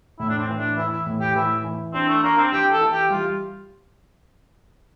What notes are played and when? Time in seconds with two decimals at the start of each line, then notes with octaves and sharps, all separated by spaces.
0.19 A2 E4
0.29 D4
0.38 C4
0.49 E3
0.57 D4
0.77 E3 E4
0.92 E4
1.06 A2
1.21 G4
1.35 E3 E4
1.65 E3
1.94 C4 D4
2.09 A3
2.23 A#3 D4
2.37 C4
2.52 E3 G4
2.72 A4
2.81 E3
2.91 G4
3.10 G3 F4